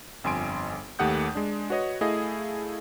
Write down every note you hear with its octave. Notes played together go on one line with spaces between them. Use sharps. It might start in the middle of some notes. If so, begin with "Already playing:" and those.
G1 F2 G#5 C6 D7
D#2 A3 G4 F#5 D#6 G6
G#3 D4
F#4 B4 C#5 D#5
A3 E4 G#4 D#5 F5